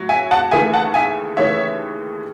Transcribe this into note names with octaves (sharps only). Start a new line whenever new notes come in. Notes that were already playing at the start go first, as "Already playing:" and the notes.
Already playing: A2 F#3
E5 G#5
F#5 A5
D#2 C#3 E3 A3 E5 G#5
F#5 A5
E5 G#5
D#2 C#3 E3 A3 C#5 E5